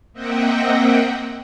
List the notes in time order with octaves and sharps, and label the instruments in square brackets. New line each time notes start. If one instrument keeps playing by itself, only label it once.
[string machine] A#3 C4 D#5 E5 F#5 G5